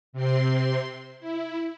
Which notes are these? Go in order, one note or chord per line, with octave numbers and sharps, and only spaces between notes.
C3 C4 C6
E4